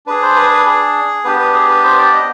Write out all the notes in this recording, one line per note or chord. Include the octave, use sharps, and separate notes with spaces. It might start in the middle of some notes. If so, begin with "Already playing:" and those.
D4 G#4 B4
C5
B4
B4
G#4
B3 D4 G4 B4
B4
G#4
B4
C5
D5
D#5